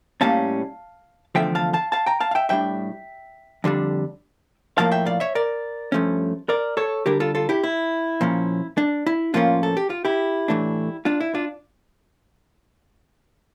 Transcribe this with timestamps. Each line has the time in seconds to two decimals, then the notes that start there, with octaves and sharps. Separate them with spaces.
0.21 A2 G3 A#3 C#4 F5 A5
1.35 E2 D3 F3 A3 E5 G5
1.55 F5 A5
1.73 F5 A5
1.92 F5 A5
2.06 G5 A#5
2.20 F5 A5
2.31 F5
2.35 E5 G5
2.49 A2 G3 D4 E5 G5
3.64 F2 D3 G3 D4
4.78 A2 F3 A#3 F5 A5
4.91 E5 G5
5.06 D5 F5
5.20 C#5 E5
5.35 A#4 D5
5.92 G2 F3 A3 C#4
6.49 A#4 D5
6.77 A4 C#5
7.06 D3 G3 D4 G4 A#4
7.20 F4 A4
7.35 F4 A4
7.49 E4 G4
7.64 E4
8.21 A#2 F3 C#4
8.78 D4
9.07 E4
9.34 A2 F3 A#3 C#4 D4 F4
9.63 A4
9.77 G4
9.90 F4
10.05 E4 G4
10.48 A2 E3 A3 D4
11.05 D4 F4
11.20 E4
11.35 D4 F4